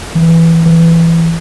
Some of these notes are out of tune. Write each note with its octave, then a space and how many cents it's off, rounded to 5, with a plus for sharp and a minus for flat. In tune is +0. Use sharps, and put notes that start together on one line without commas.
E3 +10
E3 +15